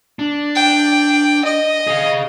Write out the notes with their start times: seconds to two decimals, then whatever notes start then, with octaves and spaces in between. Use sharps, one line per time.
0.19 D4
0.56 G5
1.45 D#5
1.87 G#4 F5